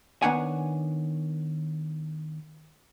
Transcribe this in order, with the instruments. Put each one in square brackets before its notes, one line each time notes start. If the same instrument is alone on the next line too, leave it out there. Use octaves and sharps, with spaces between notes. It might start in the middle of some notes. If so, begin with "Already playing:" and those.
[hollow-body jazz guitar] D#3 B3 D4 C#5 F#5 G#5